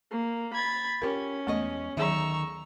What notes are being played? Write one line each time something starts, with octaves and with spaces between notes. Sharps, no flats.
A#3
B5 G#6 A6
C#4 F4 G4 A#4
E2 G#3 A3 B3 D#5 C#6
D2 D#3 F#3 G#4 E5 A#5 C#6 E6